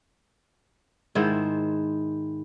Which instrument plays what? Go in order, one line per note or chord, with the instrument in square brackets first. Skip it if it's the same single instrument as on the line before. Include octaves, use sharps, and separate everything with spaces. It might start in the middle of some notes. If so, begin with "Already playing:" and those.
[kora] G#2 D#3 E4 C5